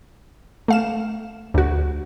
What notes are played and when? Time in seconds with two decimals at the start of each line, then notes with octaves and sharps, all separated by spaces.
0.68 A3 F5 E7
1.54 D2 F#4